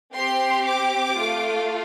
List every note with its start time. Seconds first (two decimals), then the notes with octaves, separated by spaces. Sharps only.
0.14 C4 G4 C6
0.66 D6
1.17 A3 F4 A4